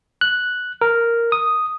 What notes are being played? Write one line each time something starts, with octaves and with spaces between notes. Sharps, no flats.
F#6
A#4
D#6